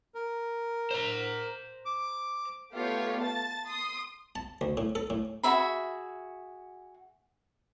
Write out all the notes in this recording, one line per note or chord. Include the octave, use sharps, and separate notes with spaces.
A#4
C5 A#5
D6
A3 B3 F4 G4 C#5
A5 A6
C6 D#6
A5
D2
A2
A4
A2
F#4 G#4 E5 B5